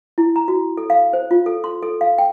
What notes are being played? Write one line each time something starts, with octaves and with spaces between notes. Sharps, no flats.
E4
A#5
F#4
A4
F5
C5
F4
A4
C6
A4
F5
G5